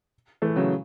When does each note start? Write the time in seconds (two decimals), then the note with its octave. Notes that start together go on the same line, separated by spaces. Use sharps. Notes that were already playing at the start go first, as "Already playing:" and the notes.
0.42 E3 A3
0.56 C#3 F#3